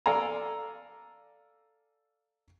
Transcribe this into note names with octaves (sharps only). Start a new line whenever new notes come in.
A4 D5 F5 G#5 A#5